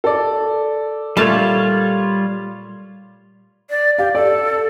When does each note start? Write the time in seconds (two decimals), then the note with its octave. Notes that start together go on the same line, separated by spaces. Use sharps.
0.04 A4 D5
1.17 A#2 G3 A3 F4 C#5 A5
3.70 D5
3.99 G4 F5
4.15 A4 D5